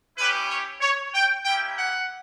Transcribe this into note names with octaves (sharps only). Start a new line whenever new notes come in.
C#4 E4 G4 B4
C#5
C#5
G5
A#3 C#4 E4 G4 G5
F#5